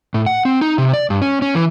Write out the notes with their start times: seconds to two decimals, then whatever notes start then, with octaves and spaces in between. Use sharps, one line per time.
0.14 A2
0.26 F#5
0.45 C4
0.61 D#4
0.78 C3
0.93 D5
1.10 G2
1.22 C#4
1.42 C#4
1.55 E3